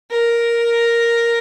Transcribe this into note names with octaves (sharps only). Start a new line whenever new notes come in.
A#4